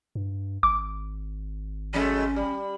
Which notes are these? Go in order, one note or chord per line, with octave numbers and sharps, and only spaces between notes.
G2
G#1 D6
F#3 G#3 A3 C#4
G3